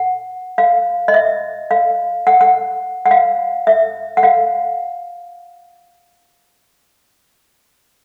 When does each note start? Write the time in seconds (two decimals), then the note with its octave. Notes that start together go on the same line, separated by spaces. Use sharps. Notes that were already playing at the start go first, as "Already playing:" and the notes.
Already playing: F#5
0.58 F5
1.08 D#5
1.14 E5
1.71 F5
2.27 F#5
2.41 F#5
3.06 F#5
3.11 F5
3.67 E5
4.17 F#5
4.23 F5